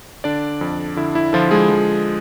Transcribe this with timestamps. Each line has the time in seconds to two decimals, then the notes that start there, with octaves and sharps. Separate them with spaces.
0.24 D3 D4 D5
0.61 F2
0.97 D3 E4
1.15 E4
1.33 D3 F3 F4
1.51 G#3 G#4
1.70 F3